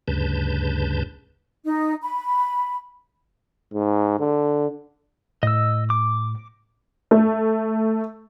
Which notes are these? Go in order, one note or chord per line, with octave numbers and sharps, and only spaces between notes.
D2 G2 C#3 B4 A5 G6
D#4
B5
G#2
D3
A2 D#5 E6
D6
A3